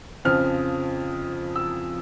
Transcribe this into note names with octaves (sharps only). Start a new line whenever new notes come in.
F2 C#3 F3 F6
E6